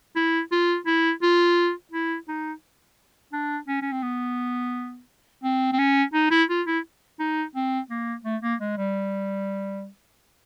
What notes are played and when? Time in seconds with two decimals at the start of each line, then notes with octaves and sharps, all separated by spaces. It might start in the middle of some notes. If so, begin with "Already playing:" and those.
0.16 E4
0.52 F4
0.87 E4
1.22 F4
1.92 E4
2.28 D#4
3.33 D4
3.68 C#4
3.82 C#4
3.92 C4
4.03 B3
5.44 C4
5.73 C4
5.79 C#4
6.14 D#4
6.31 E4
6.50 F4
6.67 E4
7.19 D#4
7.55 C4
7.90 A#3
8.24 A3
8.42 A#3
8.60 G#3
8.77 G3